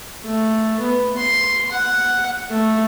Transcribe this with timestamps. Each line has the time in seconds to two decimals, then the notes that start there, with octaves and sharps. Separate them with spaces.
0.24 A3
0.80 B3
1.16 C6
1.71 F#5
2.50 A3